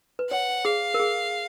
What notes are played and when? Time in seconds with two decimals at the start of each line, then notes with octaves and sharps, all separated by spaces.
0.19 B4
0.30 C#5 F#5
0.65 G#4 F5
0.94 A#4
1.00 G#4